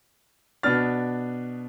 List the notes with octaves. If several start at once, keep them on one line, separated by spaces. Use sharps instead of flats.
B2 B3 D4 F6 A6